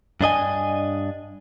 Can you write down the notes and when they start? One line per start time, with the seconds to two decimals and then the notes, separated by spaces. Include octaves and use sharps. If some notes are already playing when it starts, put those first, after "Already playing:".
0.21 G2 D4 D#5 G#5